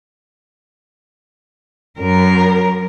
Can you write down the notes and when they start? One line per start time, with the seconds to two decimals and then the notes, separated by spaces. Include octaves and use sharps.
1.99 F#2 A#4